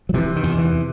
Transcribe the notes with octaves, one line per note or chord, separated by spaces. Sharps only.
F#3
C3 E3
D#3
E2
E3